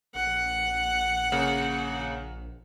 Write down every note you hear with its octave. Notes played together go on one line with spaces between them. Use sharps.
A#1 F#5
C#3 A#3